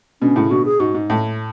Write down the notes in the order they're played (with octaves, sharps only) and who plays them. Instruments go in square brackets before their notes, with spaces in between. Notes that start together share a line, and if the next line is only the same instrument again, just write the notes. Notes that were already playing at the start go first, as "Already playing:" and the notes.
[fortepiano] B2 D3 [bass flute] C#4
[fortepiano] A2 C#3 [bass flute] E4
[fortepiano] B2 D3 [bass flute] F#4
[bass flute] G#4
[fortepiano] G#2 [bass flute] F#4
[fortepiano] G#2
A2